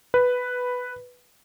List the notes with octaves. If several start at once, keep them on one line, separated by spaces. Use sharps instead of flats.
B4